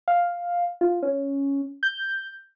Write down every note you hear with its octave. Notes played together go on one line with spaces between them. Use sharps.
F5
F4
C#4
G6